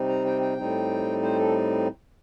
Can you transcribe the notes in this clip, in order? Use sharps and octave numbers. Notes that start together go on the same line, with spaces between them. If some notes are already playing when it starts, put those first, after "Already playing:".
Already playing: C3 G3 C4 D#4
A#5
G5
G5
A2 G3 C4 D#4
C5
A4